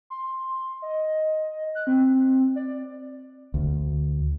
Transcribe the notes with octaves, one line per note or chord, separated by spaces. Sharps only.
C6
D#5
F#6
C4
D5
D2